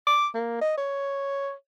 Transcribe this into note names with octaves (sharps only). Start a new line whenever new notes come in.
D6
A#3
D#5
C#5